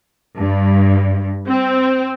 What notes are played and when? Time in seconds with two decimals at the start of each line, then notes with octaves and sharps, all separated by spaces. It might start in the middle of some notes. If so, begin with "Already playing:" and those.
0.38 G2
1.48 C4